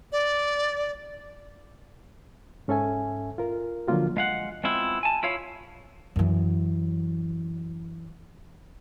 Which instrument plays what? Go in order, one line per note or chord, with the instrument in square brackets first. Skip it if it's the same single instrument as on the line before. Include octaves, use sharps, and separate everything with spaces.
[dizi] D5
[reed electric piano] G#2 C#4 A4 E5 G#5
F4 A#4
D3 F3 F#3 A#3 F4 F#4
[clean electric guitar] G#3 F5 F#5
G#3 B3 C4 E4 F4
G#5 A5
E4 F4 C#5 F5
[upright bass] F#2 E3